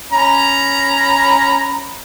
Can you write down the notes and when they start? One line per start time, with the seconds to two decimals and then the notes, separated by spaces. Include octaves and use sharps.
0.12 C#4 A#5 B5